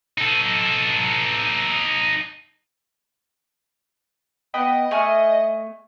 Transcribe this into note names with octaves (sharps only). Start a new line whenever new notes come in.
D#4 A4
B3 D#5 G5 B5
A3 G#5 F6